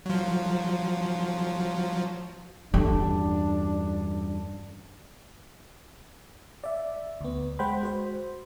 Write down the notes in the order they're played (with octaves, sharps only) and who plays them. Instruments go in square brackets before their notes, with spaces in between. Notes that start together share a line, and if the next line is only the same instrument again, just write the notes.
[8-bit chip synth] F3 F#3
[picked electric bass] E2 G2 G3 [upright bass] D3 [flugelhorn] D4
[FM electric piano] D5 E5
D2 B3
G#3 C5 F#5 G5 B5
F#4 C5